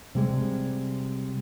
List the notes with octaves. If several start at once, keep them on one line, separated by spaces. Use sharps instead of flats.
C3 G3 G#3